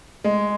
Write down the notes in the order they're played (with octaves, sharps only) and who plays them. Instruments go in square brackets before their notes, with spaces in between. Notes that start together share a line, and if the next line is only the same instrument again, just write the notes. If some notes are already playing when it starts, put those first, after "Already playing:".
[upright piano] G#3